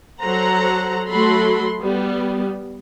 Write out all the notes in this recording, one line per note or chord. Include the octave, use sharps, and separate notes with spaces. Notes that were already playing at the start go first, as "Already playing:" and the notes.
F#3 A4 C5 F#5 A#5
F#3 A3 F#4 A4 B5 C6
G3 B3